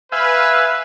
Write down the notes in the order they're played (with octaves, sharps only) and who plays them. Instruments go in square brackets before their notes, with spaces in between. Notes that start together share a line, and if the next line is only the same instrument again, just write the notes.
[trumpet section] B4 [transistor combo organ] E5 F5 G#5